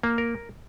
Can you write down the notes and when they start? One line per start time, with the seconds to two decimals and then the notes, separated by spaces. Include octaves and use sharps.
0.03 A#3
0.18 A#4